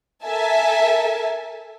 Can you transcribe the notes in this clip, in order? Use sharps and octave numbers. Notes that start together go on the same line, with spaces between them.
A4 A#4 E5 G#5 A5